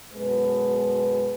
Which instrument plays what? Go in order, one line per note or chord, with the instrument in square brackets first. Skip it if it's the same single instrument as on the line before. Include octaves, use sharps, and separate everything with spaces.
[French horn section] F#2 B2 G#3 B4